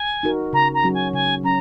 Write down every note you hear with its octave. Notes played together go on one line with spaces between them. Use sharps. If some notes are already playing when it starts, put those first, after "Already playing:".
Already playing: G#5
D#4 F#4 A#4
C#3 A#5
A#5
F#3 C#4 F#4
G#5
C#3 G#5
F#3 C#4 A#5